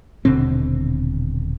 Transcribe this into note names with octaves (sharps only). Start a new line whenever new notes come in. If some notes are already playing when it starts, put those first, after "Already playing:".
D#1 B2 D3 C4